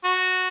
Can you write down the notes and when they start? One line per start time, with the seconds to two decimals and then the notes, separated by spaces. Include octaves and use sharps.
0.04 F#4